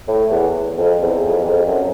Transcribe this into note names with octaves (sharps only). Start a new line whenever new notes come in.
A2
E2
F2
E2
F2
E2
F2
F#2